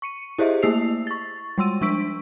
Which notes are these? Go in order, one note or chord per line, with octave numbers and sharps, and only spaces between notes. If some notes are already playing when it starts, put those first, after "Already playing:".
C#6 C#7 D#7
E4 G4 G#4 C5 D#5 E5
A3 A#3 E4 E6 C7 F7
C#6 A6
G3 G#3 C6 E6 D#7
F3 D4 C#6 E6 B6 D7